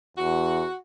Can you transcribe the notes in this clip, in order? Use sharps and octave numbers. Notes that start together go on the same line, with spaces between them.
E2 F#4